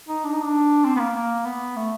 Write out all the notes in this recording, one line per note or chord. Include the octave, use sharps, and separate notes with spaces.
D#4
D4
D#4
D4
C4
B3
A#3
A#3
B3
A3